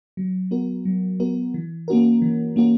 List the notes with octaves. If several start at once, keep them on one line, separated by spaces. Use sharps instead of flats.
F#3
B3 F#4 A#4
F#3
B3 F#4 A#4
E3
A#3 C#4 F#4 A#4
E3
A#3 C#4 F#4 A#4